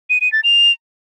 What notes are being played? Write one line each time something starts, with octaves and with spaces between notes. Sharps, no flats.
D#7
D#7
A6
F7